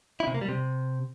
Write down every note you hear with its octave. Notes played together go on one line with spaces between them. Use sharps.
E4
C3
A#3
G3
C3